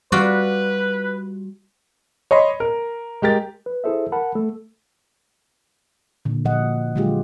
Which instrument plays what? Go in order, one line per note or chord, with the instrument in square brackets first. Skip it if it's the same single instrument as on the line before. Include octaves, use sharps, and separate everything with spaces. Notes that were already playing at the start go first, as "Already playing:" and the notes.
[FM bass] G3 [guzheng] F4 F#4 D5 [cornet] B4
[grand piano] C#5 D#5 B5 C6
A#4
G#3 G4 A#4 A6
[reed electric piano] B4
E4 G#4 A4 C5 E5
A#4 F#5 A5 B5
A3 A4
[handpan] A#2 D3
A#2 F3 D#5 F#5
D3 F3 F#3 G#3 F4 G4